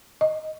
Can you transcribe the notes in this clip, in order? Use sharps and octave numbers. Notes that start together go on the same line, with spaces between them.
D#5